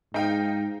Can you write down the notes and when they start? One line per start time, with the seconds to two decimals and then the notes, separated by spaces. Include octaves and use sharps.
0.14 G#2 D#4 F5 G5